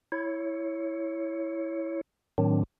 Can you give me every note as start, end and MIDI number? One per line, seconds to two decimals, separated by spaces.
0.12 2.01 64
0.12 2.01 73
2.38 2.63 45
2.38 2.63 51
2.38 2.63 54
2.38 2.63 60
2.38 2.63 62